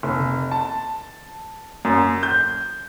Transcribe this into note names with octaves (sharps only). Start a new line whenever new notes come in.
F1
A5
F#2
G6